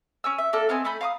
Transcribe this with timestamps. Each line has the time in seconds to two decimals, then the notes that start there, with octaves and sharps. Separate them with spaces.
0.24 C#4 G#5 E6
0.38 E5
0.53 A#3 D4 A4
0.69 B3 C4 D#5 G#5
0.85 A3 G#5 B5 G6
1.01 F5 A#5 D6 D#6